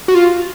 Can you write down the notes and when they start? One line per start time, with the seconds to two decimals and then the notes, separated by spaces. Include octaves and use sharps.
0.08 F#4
0.15 F4